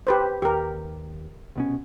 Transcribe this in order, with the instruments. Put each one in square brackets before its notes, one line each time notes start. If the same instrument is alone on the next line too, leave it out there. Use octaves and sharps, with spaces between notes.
[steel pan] G4 B4 C5
[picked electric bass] D#2 [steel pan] G4 A#4
[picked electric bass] C2 B2 C#4